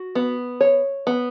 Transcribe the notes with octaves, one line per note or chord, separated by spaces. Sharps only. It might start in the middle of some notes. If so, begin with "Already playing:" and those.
Already playing: F#4
B3
C#5
B3